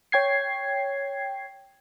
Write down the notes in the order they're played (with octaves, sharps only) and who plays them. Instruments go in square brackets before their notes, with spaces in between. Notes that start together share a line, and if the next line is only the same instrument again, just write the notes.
[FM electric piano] C#5 G5 G#6 C7